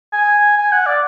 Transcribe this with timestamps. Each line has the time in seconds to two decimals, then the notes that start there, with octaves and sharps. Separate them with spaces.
0.13 G#5
0.57 G#5
0.72 F#5
0.86 D5